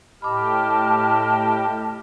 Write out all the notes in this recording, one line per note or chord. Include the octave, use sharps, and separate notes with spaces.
A2 G4 D#5 A5 B5 D6 F6